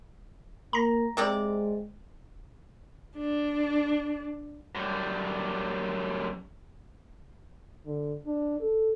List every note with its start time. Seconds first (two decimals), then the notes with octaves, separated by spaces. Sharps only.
0.73 A#3 A#5 A#6
1.17 C3 G#3 C4 D5
3.18 D4
4.75 F#2 G3
7.85 D3
8.26 D4
8.60 A4